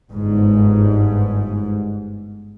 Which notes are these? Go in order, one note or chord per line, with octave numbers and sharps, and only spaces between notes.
G1 G#2